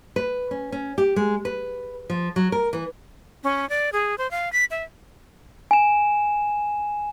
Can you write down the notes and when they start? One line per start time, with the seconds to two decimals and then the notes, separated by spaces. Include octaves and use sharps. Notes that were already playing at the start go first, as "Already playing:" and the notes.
0.16 B4
0.51 C#4
0.72 C#4
0.98 G4
1.16 G#3
1.45 B4
2.10 F3
2.36 F#3
2.52 A#4
2.73 E3
3.44 C#4
3.70 D5
3.93 G#4
4.18 C5
4.31 F5
4.53 B6
4.71 E5
5.71 G#5 E7